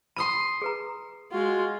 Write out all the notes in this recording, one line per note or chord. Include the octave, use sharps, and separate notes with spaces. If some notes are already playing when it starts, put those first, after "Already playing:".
B5 C6 D#6 D#7
G#4 B4 A#5
G#3 F4 F#4